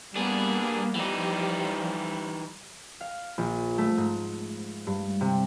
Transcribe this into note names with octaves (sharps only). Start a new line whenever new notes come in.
G3 A#3 B3 D4 G#4
E3 F3 G3 D#4
F5
A#1
A3
G#2
G2
C3